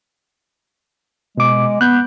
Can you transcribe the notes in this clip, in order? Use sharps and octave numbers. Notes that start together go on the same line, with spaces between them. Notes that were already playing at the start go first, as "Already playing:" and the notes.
B2 G#3 D6
B3 F#6 G6